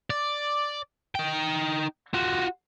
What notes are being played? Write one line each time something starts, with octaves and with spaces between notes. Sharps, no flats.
D5
D#4 G5
F4 F#4